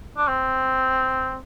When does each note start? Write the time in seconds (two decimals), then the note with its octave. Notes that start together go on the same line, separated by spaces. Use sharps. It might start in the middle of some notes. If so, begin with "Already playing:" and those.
0.17 D4
0.27 C4